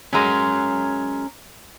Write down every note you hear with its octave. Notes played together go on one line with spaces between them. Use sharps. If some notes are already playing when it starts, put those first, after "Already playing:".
F#3 G#3 C#4 A#4